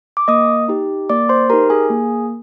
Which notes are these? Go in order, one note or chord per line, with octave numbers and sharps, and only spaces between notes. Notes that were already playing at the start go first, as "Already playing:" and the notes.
D6
A#3 D#5 D#6
D#4 G4
A#3 D5 D6
C5 C6
D#4 G4 A#4 A#5
G#4 G#5
A#3